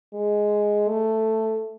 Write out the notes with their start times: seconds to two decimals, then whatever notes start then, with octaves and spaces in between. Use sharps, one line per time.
0.14 G#3
0.89 A3